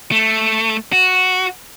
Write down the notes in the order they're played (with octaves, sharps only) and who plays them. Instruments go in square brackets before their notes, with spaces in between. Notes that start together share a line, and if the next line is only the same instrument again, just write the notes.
[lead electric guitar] A3
F#4